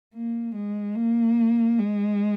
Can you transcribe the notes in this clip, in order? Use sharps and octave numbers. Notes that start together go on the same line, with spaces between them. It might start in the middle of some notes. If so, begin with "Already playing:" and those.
A#3
G#3
A#3
G#3